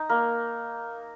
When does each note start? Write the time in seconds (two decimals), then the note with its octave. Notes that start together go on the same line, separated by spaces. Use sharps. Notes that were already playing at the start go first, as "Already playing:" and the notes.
Already playing: D#4
0.09 A#3